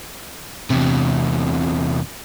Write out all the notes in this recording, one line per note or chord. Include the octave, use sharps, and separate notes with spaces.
E2 C3